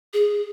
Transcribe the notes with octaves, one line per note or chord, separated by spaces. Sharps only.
G#4